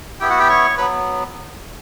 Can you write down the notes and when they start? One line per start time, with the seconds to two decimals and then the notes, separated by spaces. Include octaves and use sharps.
0.20 B3 E4 G4 G5
0.30 F#4 F#5
0.39 G4 G5
0.49 C#5 C#6
0.77 F#3 B3 B4 B5